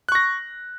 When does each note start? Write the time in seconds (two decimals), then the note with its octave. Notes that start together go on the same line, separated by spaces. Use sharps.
0.09 F#6
0.12 C#6
0.15 A#6